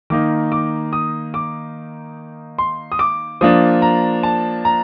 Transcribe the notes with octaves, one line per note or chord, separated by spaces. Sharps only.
D#3 A#3 D#4 D6
D6
D#6
D6
C6
D#6
D6
F3 A#3 D4 D#6
A#5
A5
A#5